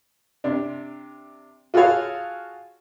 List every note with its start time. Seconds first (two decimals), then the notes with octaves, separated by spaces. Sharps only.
0.44 C3 D4
1.74 F4 F#4 G#4 A4 C#5 F5